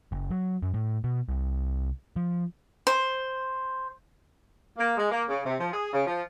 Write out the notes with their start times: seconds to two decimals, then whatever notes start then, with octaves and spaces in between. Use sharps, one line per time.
0.12 F#1
0.31 F#3
0.63 F#2
0.74 A2
1.04 B2
1.29 C2
2.16 F3
2.87 C5
4.78 A#3
4.97 G#3
5.11 A#3
5.29 C#3
5.46 C3
5.60 F3
5.72 G#4
5.93 C#3
6.06 F3